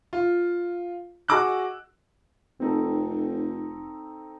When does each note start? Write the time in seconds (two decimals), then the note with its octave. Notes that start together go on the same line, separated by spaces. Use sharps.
0.13 F4
1.28 F#4 G#4 D#5 D6 E6 F#6
2.60 F1 C4 D#4 A4